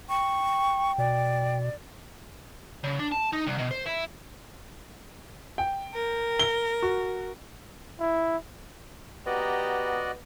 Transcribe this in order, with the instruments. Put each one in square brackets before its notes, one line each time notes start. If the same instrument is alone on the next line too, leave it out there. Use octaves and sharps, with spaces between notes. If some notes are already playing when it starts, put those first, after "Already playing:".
[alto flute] G5 [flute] C#6
[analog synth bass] B2 [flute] D5
[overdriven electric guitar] C#3
D4
A5
D#4
C2
B2
C5
E4
[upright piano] G5
[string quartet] A#4
[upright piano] G7
F#4
[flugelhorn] E4
[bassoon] B3 [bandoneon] F#4 D5 D#5 [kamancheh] G4 A#5